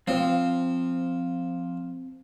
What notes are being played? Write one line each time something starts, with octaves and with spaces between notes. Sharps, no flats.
F3 C4